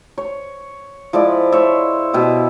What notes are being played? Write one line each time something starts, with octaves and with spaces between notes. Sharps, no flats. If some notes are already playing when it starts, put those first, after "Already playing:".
C#5
F3 G#3 E4 D5
C5 C#5 E5
B2 E4 G4